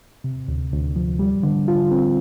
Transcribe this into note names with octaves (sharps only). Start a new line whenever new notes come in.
C3
D2
D2
F3
G3
D3
F4
C4